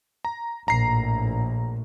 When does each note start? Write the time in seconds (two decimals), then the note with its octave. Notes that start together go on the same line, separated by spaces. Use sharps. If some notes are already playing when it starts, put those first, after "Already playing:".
0.25 A#5
0.68 A#1 A2 A#5 C7